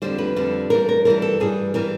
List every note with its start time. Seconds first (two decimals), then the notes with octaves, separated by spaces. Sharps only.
0.02 F2 D3 G3 C5
0.18 B4
0.36 F2 D3 G3
0.70 G2 E3 G3 A#4
0.89 A#4
1.05 G2 E3 G3 A#4
1.22 A4
1.40 G2 E3 G3 G#4
1.74 E3 G3 A#4